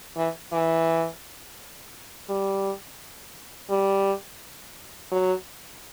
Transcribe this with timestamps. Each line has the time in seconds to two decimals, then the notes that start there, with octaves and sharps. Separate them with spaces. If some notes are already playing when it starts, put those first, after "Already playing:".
0.17 E3
0.52 E3
2.29 G3
3.70 G3
5.12 F#3